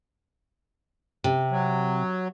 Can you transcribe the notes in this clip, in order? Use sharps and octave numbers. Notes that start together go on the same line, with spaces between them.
C3
F#3